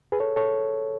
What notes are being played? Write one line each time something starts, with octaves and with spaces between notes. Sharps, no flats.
G#4 B4
A4 C#5
A4 C#5